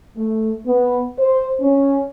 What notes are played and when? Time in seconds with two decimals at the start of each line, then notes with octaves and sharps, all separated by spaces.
0.17 A3
0.65 B3
1.18 C5
1.60 C#4